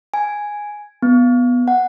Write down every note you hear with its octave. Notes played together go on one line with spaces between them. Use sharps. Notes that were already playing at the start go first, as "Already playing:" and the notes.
G#5
B3
F#5